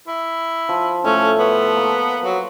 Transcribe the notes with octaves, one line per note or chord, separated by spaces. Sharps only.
E4
F3
A2 A3 C#4
B3
A#3
F#3